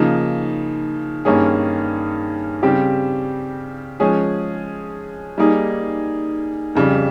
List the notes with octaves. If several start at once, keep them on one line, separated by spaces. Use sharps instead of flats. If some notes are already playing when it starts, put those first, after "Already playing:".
Already playing: C#3 F3 A#3 D#4
G2 D#3 A#3 C#4 G#4
C#3 G3 C4 G4
F3 G#3 C#4 G#4
G3 A#3 D#4 G#4
F2 C#3 G3